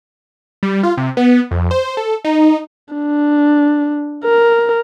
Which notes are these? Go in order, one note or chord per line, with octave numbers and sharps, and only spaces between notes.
G3
F4
C3
B3
F2
C5
A4
D#4
D4
A#4